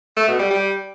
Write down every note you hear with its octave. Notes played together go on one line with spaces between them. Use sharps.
A3
B2
G3
G3